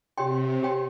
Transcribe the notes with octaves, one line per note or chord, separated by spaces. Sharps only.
C3 G4 C#5 G5 C6
G4 C#5 G5 C6